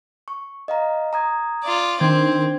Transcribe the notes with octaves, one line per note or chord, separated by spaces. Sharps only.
C#6
D#5 F5 A#5
A#5 D#6 G#6
F4 D5
D#3 C4 D4 G#6